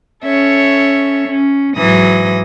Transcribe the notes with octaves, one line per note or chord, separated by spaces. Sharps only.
C#4 A4 C#5 E5
C#4
G#2 E3 F#3 D#6 A#6